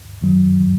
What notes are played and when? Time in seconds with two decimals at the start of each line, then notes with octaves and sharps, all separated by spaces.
0.22 F#2 D#3 F#3